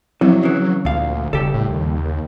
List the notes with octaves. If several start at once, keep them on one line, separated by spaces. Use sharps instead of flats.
C2 C3 F3 F#3 C4 E4
C#3 E3
D2 A#2 F5
E1 C2 C#3 G4 A4
A2
D#2